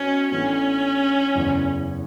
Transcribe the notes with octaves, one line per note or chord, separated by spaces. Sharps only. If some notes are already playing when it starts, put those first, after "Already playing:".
Already playing: B2 C#4
A1 A2 E3 B3 C#4 D4
F#1 E2 C#3